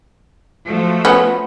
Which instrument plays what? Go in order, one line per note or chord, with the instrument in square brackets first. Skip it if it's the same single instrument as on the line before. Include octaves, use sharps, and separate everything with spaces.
[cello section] F3 A3 F#4
[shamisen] B3 C#4